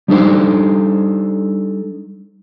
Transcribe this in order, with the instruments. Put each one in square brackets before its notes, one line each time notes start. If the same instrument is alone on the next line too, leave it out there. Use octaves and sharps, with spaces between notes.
[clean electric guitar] G3 D4 D#4 A4 C5